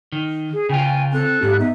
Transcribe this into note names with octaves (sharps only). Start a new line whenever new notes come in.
D#3
G#4
C#3 F4 G5 G#5
C4 A4 F#6
G#2 G4
B3 D#4 E5